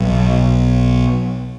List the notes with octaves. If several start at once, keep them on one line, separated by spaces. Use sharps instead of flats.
B1